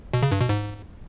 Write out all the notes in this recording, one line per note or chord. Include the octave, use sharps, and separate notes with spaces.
B2
C#3
G2
B2
G#2